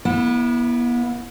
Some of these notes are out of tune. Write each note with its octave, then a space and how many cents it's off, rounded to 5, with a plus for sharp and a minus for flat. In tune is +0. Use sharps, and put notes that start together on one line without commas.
B3 -40 E4 +0